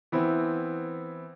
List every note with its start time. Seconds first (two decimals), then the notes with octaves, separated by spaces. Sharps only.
0.12 E3 B3 C4 E4